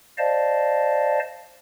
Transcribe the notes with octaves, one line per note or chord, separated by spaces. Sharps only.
C5 D5 D#5 F5 A5